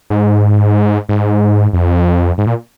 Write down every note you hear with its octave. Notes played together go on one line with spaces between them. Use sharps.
G#2
G#2
F2
G#2
A#2